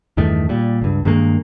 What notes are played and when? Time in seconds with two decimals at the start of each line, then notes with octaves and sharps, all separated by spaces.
0.17 E2 G2 D#3 A3
0.49 A#2 G3
0.81 C#2 G2
1.05 G2 D#3 G#3 A#3